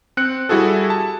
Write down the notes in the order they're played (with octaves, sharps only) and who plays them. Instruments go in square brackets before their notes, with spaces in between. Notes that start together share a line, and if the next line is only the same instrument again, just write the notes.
[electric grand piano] C4 F#6 C#7
G3 E4 F#4 G#4 A4
A5